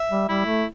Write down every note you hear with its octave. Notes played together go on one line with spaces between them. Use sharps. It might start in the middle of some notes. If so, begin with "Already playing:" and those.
Already playing: E5
G3
G3 E4
A3